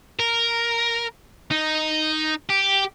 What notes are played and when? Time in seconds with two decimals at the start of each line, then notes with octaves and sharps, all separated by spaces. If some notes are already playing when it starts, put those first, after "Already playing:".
0.20 A#4
1.51 D#4
2.50 G4